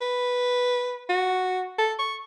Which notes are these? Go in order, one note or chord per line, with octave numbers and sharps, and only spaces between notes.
B4
F#4
A4
C#6